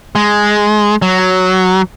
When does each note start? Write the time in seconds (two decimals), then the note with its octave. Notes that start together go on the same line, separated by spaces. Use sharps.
0.15 G#3
1.02 F#3